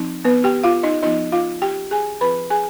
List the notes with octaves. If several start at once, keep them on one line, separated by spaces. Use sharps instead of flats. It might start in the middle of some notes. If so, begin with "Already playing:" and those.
Already playing: F3 C4 D#4
B3 B4
G4 G5
F4 F5
D#4 D#5
F3 B3 D#4 F4 D#5
F4 F5
G4 G5
G#4 G#5
F3 C4 F4 B4 B5
G#4 G#5